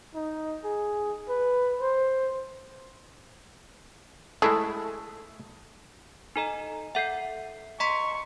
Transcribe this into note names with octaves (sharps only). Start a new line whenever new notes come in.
D#4
G#4
B4
C5
G#3 A3 E4 G#4
D#4 A4 D#5 G#5 A#5 E7
A4 E5 F#5 G6 C7
D#5 A#5 C6 C#6 B6